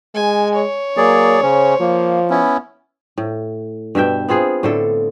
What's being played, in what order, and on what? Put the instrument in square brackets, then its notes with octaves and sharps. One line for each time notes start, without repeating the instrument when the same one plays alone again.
[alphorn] G#3 [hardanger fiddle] G#5
[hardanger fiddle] C#5
[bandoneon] F#3 G#4 D5 [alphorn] A#3
[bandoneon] C#3 C#4 [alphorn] C5
[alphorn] F3 [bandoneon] A#3
[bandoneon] B3 C#4 E4
[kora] A2
G2 B2 E5 G5
B3 C4 F4 G#4
A2 D3 A4